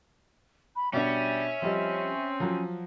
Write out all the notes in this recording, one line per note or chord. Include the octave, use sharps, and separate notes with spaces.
B5
B2 G3 C#4 D4 E5
F3 G3 C4 D#5
F3 F#3